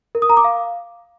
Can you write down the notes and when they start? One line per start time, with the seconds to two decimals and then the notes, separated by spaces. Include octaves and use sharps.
0.15 A#4
0.22 D#6
0.30 A#5
0.37 D6
0.44 F5